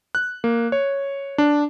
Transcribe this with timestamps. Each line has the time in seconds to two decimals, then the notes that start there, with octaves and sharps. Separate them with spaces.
0.15 F#6
0.44 A#3
0.72 C#5
1.38 D4